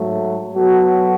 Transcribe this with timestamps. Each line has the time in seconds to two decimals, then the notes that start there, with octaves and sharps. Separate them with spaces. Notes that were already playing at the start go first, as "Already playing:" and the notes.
Already playing: G#2 F#3 A3
0.52 F#3 B3 F#4 A4